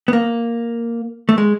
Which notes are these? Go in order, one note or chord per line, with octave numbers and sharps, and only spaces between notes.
B3
A#3
A3
G#3